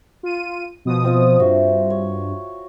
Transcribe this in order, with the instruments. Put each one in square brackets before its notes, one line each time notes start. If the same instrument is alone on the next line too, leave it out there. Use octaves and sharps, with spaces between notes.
[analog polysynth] F4 D#7
B2 F3 D#6
[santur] C4 F4 D#5
[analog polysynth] G2 [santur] F#4 E5
[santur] C#5